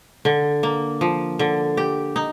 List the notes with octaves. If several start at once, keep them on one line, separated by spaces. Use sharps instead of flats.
D3
A#3
F3
D3
G4
D#4